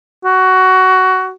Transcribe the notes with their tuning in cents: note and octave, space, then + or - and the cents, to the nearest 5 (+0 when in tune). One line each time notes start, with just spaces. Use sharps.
F#4 +15